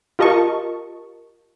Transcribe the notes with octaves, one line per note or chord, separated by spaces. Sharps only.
F4 G4 A#4 D#5 A5 C#6